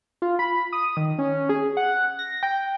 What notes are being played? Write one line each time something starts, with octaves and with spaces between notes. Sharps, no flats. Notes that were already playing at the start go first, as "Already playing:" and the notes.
F4
B5
D#6
D#3
C#4
G#4
F#5
A#6
G5